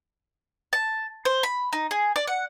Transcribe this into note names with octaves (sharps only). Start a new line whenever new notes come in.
A5
C5
B5
D#4
G#4
D5
F#5